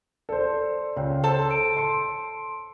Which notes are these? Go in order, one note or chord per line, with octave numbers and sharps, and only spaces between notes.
A4 C5 D5
C#2 C#5 G5
A4 C5 A5
D7
C6 C#7